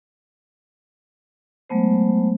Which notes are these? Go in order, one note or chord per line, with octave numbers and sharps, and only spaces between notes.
F#3 G#3 A3 B3 C5